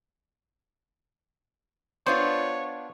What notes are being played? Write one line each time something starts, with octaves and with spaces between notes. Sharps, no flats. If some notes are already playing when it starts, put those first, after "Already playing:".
B3 D4 F4 C5 C#5